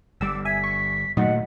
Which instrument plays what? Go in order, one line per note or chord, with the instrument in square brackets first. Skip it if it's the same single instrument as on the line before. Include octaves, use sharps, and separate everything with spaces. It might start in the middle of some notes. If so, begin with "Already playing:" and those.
[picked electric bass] G1 G3 [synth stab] D6 E6
[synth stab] E5 G#5 [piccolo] B6
[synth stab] C#6
[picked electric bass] A#2 A3 [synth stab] D#3 F#3 D#5 [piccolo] F#5